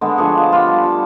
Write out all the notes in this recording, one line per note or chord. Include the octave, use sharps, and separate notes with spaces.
D3 G#3 B3
F3 D4 G#4 C#6
A5
F4 G4
G3
A5